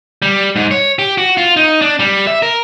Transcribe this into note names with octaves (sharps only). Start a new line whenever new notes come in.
G3
G#2
C#5
G4
F#4
F4
D#4
D4
G3
E5
A#4